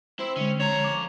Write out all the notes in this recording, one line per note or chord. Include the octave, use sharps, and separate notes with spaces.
C4 E4
D3 G#3 C#4
F2 C#5 A#5
D6